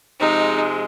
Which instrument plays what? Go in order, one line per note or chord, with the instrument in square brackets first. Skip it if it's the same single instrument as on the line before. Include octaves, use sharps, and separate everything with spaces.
[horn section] C3 F3 G#3 [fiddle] D#4